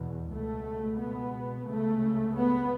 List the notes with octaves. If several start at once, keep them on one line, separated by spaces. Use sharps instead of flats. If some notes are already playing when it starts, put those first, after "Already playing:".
Already playing: E2 B2
C#2 B2 A3
B3
C#2 C#3 A3
B3